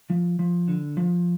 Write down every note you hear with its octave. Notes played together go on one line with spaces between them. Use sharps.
F3
F3
D3
F3